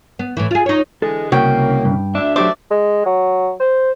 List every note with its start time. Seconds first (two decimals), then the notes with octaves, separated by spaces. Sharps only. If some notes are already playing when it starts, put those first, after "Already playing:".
0.19 B3
0.37 A2 E3
0.51 F4 G#4
0.66 D#4 C#5
1.02 D3 E3 G#3 A4
1.32 C2 C#3 A#3 F#4 C#5 G5
1.85 G2
2.15 D2 D4 E5
2.36 F#3 A3 G4 C5 D5 E5 D6
2.71 G#3
3.05 F#3
3.60 C5